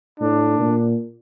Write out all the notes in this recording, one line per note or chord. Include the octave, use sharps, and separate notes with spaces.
A2 D4
A#2